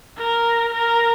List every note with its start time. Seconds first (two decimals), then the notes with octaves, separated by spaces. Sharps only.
0.18 A#4
0.74 A#4